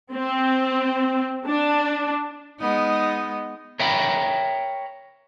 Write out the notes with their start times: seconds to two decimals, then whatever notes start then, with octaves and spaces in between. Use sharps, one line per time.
0.13 C4
1.47 D4
2.59 G#3 B3 D#4
3.79 A#4 C#5 E5 G5 A#5 B5